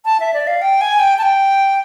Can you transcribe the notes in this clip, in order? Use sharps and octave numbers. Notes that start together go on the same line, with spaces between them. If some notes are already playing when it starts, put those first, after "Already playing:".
A5
E5
D5
F5
G5
G#5
G5
A5
G5